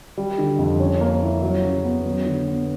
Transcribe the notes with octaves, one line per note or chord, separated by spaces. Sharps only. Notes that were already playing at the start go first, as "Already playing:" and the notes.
G3
D3
F2
C#4
A#3
E4
F#3
C#3
B3
F#3
D3
B3